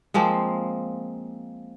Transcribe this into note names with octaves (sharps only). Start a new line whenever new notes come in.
F3 G#3 A#3 C4